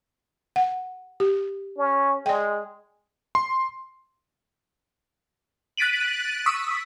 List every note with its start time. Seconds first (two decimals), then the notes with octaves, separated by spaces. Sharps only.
0.56 F#5
1.20 G4
1.78 C#4
2.26 G#3 D5 G5
3.35 C6
5.77 F#6 A6 B6 D7 D#7 F#7
6.46 C#6 D#6 E6 B6